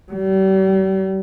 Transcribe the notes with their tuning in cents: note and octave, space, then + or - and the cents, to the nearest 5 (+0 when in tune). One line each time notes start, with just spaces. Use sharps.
G3 -40